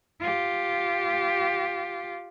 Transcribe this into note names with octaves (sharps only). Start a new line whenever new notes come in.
F4 G4